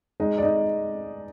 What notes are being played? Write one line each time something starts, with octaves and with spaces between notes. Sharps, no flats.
G#3 D#4 D#5
D5
D#4 D#5